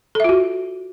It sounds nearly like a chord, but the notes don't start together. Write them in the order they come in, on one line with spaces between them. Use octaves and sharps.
A4 E5 F4 F#4